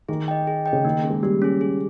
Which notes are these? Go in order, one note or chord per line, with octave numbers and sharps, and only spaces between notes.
D#3 G#4
D#5 G5
G#4
D#5 G5
C#3
D#3 A#3
C#4 G#4
G#3
G3 A#3
C#4 G#4
G#4